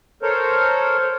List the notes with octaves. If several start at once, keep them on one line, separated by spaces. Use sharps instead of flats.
A4 A#4 C5 C#5